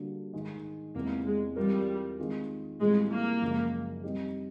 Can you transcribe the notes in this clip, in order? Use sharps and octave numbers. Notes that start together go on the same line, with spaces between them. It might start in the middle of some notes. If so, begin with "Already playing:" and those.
Already playing: D3 G3 A#3 D4 F#4
G#2 D#3 G#3
E2 C3 E3 G#3 A#3
G#3
E3 G3 G#3 C4 F4 A#4
D#3 G#3 C4 F4 G#4
A2 E3 G3 G#3 C4 F4
A#3
F#2 C#3 F3 G#3
G3 C4 D#4 G4